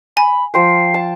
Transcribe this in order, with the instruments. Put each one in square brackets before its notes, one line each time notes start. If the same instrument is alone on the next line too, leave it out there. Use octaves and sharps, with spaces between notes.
[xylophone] G#5 [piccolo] B5
[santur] F3 C5 G5 [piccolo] C7
[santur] A5